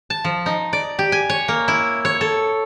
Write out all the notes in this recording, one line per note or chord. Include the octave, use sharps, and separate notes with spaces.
A5
F3
D#4
D5
G4
G#5
C#5
A#3
E4
C#5
A4